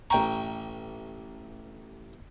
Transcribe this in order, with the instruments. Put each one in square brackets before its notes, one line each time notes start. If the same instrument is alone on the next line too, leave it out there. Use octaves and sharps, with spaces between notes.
[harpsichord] A1 G5 C#6 [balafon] A#5